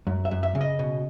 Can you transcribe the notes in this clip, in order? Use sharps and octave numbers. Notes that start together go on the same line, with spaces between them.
F#2
E5
F#2
E5
C#3
D#5
B2